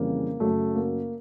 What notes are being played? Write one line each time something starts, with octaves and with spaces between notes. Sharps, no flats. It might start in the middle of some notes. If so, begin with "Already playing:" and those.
Already playing: F2 C#3 E3 G3 A#3
F#2 C#3 F#3 A3
A#3